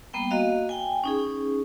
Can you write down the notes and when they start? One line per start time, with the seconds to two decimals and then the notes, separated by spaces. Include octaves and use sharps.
0.14 G3 A#3 B3 G5
0.31 A#3 F#4 D#5 F5
0.69 G5 G#5
1.04 C#4 D#4 G#4